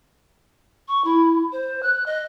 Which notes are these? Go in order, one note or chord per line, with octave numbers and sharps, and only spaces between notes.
C#6
E4
C5
F#6
D#5